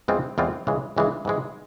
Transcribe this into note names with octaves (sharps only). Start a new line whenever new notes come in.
E2 E3 G#3 C4 F4
E2 E3 G#3 C4 F4
C#2 C#3 E3 G#3
C#2 C#3 E3 G#3
G#2 E3 G#3